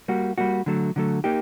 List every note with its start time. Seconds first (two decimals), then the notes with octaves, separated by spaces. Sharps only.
0.08 G3 A#3 F#4
0.38 G3 A#3 F#4
0.66 D3 F#3 A3
0.96 D3 F#3 A3
1.24 A#3 D#4 G4